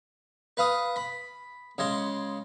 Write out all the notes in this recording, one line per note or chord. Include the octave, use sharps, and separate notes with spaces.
B4 F5 D#6
B5
C#3 G#3 C6